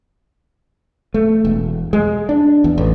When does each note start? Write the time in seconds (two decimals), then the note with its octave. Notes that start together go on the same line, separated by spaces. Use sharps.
1.14 A3
1.45 E1
1.93 G#3
2.29 D4
2.64 E2
2.78 A1